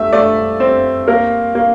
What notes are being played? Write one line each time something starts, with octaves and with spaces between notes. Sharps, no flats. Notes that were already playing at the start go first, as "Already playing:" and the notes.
Already playing: A3 E5
A3 D5
C4
A#3 A#4
A#3